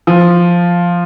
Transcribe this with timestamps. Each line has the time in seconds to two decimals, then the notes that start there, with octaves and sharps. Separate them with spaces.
0.07 F3